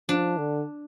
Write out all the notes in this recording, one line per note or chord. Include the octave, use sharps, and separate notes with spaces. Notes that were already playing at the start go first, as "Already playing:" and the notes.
F3 D4
D3